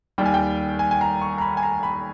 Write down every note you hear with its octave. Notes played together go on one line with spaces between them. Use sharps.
D#2 D#3 G3 G5
G#5
G5
G#5
G#5
A#5
C#6
A#5
B5
G#5
A#5
B5